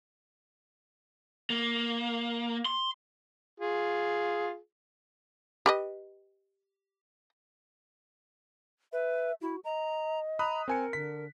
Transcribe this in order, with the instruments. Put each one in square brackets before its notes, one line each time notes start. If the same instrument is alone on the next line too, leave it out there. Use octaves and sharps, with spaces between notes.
[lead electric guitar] A#3
C6
[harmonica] F4 G#4
[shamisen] G4 B4 D#5
[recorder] B4 [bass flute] E5
[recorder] E4 [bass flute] F#4
[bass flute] D#5 [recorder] A#5
[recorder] A#5 [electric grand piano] B5 D#6 F#6
[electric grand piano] C4 G#5 C#7 [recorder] A#4
[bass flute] D3 [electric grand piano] B6